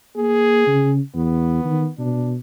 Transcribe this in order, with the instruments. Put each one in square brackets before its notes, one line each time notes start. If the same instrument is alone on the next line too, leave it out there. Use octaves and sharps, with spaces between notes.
[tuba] A#3 [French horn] G#4
[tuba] C#3
[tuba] E2 [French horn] B3
[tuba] D#3
[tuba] B2 [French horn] D4